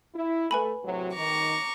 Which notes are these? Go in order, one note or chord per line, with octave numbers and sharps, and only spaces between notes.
E4
A3 B4 G#5 B5
A2 C3 F#3
D#3 A#5 C#6 D6